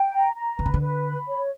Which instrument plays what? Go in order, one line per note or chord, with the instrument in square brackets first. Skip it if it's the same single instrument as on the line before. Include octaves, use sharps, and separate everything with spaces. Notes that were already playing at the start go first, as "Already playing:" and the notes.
Already playing: [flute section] G5
A#5
A#5
[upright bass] D3 [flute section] B4
[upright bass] C#3
D3
[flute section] B4
B5
C#5